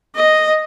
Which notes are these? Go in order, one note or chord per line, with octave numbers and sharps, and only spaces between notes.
D#5